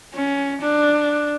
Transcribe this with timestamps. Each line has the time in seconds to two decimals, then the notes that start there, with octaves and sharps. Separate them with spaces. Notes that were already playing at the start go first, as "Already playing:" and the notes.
0.14 C#4
0.61 D4